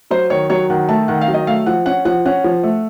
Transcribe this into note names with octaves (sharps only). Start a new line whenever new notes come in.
F#3 C5
D#3 C#5
F#3 C#5
D#3 F#5
A3 A5
D#3 F#5
F5
F#3
D#5
A3 F5
F3 F#5
C#4 F#5
F3 F#5
C#4 F#5
F3
A3